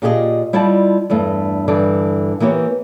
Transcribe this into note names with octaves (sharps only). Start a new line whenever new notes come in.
A#2 F4 G4 G#4 A#4 D#5
G3 E4 F4 D5 D#5 A5
E2 G2 A3
G2 D3 E3 A4 D5
E3 A#3 B3 G4 C#5